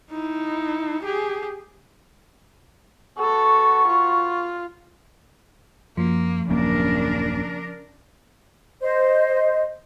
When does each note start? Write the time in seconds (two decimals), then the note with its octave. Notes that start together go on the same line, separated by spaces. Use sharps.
0.11 D#4 E4
1.03 G4 G#4
3.18 B3 F#4 A4 C#6
3.87 F4
5.97 F#2 F3 A#3
6.49 D#1 F#2 C#3 A#3 D4 A#4
8.81 C5 D#5